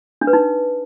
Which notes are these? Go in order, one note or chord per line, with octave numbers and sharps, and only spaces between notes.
D4
B4
D#4